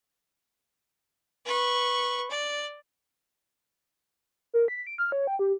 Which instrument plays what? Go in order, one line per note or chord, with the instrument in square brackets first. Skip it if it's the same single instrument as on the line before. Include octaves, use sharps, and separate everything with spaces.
[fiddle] B4 C#6
D5
[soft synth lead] A#4
B6
D7
F6
C#5
G5
G4